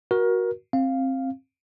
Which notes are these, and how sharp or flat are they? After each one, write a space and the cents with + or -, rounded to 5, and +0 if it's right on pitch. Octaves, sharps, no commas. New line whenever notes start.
F#4 +0 A#4 +25
C4 +20 F5 +0